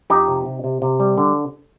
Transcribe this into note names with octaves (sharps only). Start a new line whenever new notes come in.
F2 D#4 G4
C3
C3
C3
C3
G3
D3